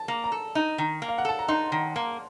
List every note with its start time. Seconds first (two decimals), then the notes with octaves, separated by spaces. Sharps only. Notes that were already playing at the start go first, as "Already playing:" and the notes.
Already playing: A5
0.08 A#3
0.24 A#5
0.32 A4
0.55 D#4
0.78 D#3
1.02 A#3
1.09 F5
1.18 F#5
1.25 A4 A5
1.39 A#5
1.48 D#4 C6
1.72 D#3
1.95 A#3 A#5